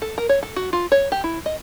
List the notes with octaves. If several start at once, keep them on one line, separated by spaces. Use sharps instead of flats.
A4
A#4
C#5
A4
F#4
F4
C#5
G4
E4
D#5